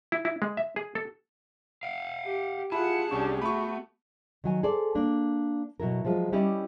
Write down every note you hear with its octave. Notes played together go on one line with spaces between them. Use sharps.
E4
E4
G#3
E5
G#4
A4
F5 F#5
G4
E4 F4 G#4 F#5 A5 B5
C2 C#4 D4 G4 C#6
A3 B3 F#4 B5 C#6
D#3 F#3 G#5
G#4 A4 C5 D5
A#3 D4
B2 F#3 E4 A#4
F3 F#3 G#3 F4
G3 C#4 E4 G4 D5 D#5